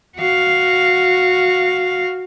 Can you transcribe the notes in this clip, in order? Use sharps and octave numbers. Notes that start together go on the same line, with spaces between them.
F#4 F5